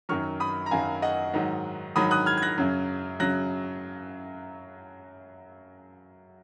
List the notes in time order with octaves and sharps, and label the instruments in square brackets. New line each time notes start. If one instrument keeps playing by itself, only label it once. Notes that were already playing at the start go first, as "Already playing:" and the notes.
[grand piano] F#2 D#3 F#3 C#6 F6
B5 D#6
A#5
F#2 D#3 F#3 F5 G#5
D#5 F#5
G#2 D#3 F#3
G#2 D#3 F#3 B5 D#6
D#6 F#6
F6 G#6
G#6
F#6 A#6
F#2 C#3 F#3
C#3 F#3 F#6 A#6